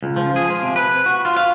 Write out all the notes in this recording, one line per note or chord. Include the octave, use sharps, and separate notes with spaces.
C#2
F3
G#4
F3
C3
B4
F#4
F4
F5